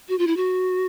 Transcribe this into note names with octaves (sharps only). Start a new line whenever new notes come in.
F#4
F4
E4
F#4